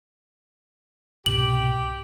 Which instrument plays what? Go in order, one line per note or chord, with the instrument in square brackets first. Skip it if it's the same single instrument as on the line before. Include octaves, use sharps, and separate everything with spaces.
[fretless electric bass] C2 G#2 B2 [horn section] G4 [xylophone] F#7